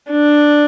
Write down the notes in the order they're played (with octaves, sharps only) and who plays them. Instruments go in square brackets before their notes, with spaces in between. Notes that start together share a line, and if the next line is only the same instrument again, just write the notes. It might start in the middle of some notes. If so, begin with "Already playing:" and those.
[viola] D4